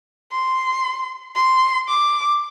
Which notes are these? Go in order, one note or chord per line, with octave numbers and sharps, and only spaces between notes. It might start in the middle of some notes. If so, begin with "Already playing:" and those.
C6
C6
D6